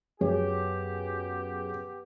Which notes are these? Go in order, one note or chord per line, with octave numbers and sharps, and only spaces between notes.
F#2 B3 G4 G#4 C#5